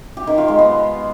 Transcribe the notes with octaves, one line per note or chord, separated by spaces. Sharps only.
G4
D#3
F4
G#3
B3